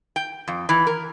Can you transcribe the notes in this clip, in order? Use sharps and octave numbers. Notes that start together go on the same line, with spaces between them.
G5
F2
E3
A#4